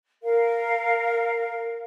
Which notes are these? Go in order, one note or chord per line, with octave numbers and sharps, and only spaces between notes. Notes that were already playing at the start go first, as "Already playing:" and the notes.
A#4 F5